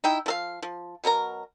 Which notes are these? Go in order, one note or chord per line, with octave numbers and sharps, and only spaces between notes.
D#4 E4 G5
F3 A4 F5
F3
B2 F#3 A#4 A#5